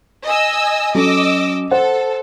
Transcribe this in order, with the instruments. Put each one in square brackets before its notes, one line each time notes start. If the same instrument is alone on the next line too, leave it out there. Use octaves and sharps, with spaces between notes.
[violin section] D#5 G#5 E6
[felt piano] F#3 C#4 A4 [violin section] D#5 D6 E6
[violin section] A4 [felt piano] C5 F#5